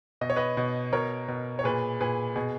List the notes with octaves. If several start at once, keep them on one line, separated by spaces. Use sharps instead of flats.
B2 D#5
C#5
B4 D#5
B2
B2 A#4 C#5
B2
C#5
A#2 G#4 B4
A#2 G#4 B4
B2 G#4